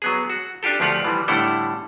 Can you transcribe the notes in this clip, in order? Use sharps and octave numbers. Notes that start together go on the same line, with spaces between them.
F#3 B3 G#4
F#4
D4 F4 G4 A4
D2 F3 A3 F4 G4 F#5
E3 F3 G3
A2 D3 G3 A3 E4 A4